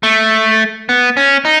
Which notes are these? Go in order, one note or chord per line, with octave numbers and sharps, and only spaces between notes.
A3
B3
C#4
D#4